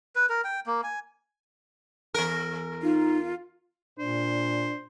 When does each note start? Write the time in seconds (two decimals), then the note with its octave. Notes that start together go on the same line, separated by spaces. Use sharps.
0.16 B4
0.29 A#4
0.44 G5
0.66 A#3
0.83 G#5
2.14 E2 A#4
2.82 D#4 F4
3.99 A#2 D4 C5